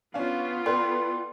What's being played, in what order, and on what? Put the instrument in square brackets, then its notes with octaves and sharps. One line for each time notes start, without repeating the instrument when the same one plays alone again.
[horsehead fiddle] B3 F4 [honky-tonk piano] C#4 D4 F5
[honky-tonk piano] A4 B4 [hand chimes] D5 G5 C6